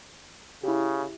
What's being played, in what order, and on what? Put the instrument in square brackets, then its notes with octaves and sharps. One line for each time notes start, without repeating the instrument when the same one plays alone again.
[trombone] C#3 [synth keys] E4 G4